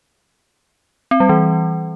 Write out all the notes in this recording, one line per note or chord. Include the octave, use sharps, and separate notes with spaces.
C4
G3
E3